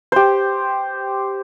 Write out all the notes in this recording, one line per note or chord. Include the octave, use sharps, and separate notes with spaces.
G4 C5